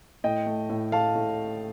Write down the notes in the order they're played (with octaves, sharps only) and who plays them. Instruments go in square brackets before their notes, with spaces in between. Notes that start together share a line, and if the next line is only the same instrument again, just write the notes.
[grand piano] A2 D#5 G5
A3
A2
A3 F5 A5
A2